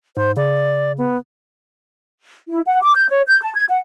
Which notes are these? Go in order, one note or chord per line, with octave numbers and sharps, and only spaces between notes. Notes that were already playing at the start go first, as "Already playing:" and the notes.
G#2 C5
C#3 D5
B3
E4
F#5
D6
G6
C#5
G6
A5
G#6
F#5